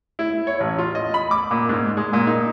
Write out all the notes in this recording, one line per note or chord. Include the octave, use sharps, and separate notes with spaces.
E4
C#5
A1
F4
D#5
B5
D6
A#2
G#2
G#3
A#2
D#4